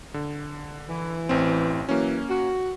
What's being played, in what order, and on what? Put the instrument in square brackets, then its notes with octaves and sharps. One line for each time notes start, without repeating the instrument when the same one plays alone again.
[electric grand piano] D3
[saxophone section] E3
[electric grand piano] A1 C4
[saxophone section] E3 F#3 [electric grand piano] A#3 C#4
[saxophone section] F#4